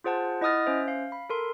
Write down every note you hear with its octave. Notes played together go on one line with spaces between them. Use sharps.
F4 G#4 C5 F#5 A5
E4 D#5 F#5 D#6 F6 A6
C#4 C5 E5
F5
B5
A4 A#4 C6